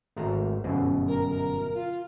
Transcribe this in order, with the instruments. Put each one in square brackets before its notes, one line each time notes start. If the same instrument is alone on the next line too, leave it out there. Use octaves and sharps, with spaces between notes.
[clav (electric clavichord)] G#1 A3 A#5
G1 F#2 B2
[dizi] A#4
A#4
F4